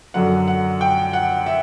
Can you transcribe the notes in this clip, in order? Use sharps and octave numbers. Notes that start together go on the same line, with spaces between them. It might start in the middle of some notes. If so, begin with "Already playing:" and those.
F#2 D3 F#3 F#5
F#5
G5
F#5
E5